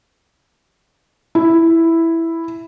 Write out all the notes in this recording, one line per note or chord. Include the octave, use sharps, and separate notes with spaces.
E4